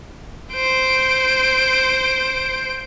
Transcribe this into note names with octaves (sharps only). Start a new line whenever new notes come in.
C5 D7